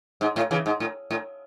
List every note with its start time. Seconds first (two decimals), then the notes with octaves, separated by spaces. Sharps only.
0.21 G#2
0.36 A2
0.51 C#3 E3
0.66 G#2
0.80 A2
1.11 A2